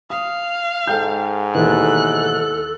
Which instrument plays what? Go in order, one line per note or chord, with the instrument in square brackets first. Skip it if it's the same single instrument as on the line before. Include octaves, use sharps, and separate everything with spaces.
[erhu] F5 [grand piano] D#6
[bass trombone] G#2 [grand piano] A4 G5 G6
[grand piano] D#2 B2 E3 [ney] A4 [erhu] F#6